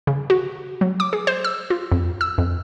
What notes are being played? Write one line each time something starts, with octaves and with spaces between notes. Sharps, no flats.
C#3
F#4
F#3
D6
G#4
C5
E6
F4
F2
E6
F2